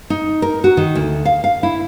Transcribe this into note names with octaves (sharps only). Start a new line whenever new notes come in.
D#4
A#4
F#4
D#3
D2
F5
F5
E4